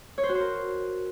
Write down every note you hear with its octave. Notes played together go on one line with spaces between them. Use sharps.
C#5
C5
F#4
C5
A#4